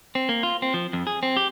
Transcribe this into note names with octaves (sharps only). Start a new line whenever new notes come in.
C4
A#3
F4
C4
F3
F2
G#4
C4
G4